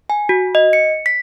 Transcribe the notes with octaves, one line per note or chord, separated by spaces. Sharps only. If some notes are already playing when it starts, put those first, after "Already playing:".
G#5
F#4
D#5
C#7
B6